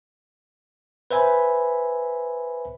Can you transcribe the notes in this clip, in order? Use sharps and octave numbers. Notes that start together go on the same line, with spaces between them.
B4 C5 E5 G#5 B5